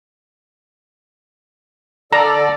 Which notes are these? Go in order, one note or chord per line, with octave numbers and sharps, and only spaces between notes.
D3 A4 D5 A#5